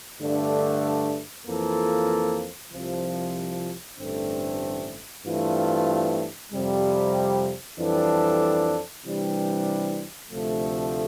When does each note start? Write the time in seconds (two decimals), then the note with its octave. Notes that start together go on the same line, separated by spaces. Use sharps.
0.21 G2 D3 A3 D4
1.47 F2 E3 A#3 F4 A4
2.73 C2 C3 F3
4.00 A1 G2 D3 A3 C4
5.26 G2 E3 A3 C4 F4
6.52 F2 C3 G3
7.79 F2 E3 G3 D4 A4
9.05 C3 E3 G3 D4
10.31 D2 C3 F3 A3